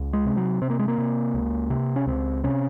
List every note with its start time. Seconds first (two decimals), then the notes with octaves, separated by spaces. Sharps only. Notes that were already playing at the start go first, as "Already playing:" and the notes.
Already playing: C#2
0.13 G#3
0.25 C3
0.37 F#3
0.62 C3 C4
0.70 A#3
0.79 G#3
0.88 A#3
0.98 C3
1.34 C#2
1.70 C3
1.96 C#4
2.07 C#2 C4
2.44 C3 C#4